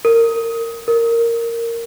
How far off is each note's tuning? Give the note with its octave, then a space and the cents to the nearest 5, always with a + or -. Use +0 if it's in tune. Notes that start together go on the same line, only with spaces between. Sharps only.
A#4 -25
A#4 -10